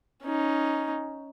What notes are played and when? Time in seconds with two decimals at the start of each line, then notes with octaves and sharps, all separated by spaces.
0.24 C#4 D#4